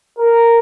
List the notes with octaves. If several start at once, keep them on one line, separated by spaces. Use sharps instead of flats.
A#4